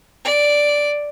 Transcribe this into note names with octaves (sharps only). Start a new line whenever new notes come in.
D5